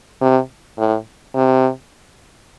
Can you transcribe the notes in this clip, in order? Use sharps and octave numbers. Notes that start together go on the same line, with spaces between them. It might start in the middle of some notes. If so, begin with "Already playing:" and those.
C3
A2
C3